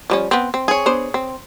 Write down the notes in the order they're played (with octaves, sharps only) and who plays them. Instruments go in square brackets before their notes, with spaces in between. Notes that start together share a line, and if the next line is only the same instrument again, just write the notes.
[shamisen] F3 G3 C#4
B3 C4
C4
[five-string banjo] G#4 C#5
[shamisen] B3 D4 C5
C4